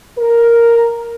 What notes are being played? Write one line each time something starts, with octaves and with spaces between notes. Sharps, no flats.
A#4